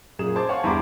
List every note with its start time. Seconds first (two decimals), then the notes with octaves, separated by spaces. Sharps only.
0.19 F#2 A#2 G#4 E7
0.36 C5 A5 C6 D6 G#6
0.49 C#5 F5 F#5 G#5 A5 C#6
0.64 E2 G2 E4 A#5 C6 D6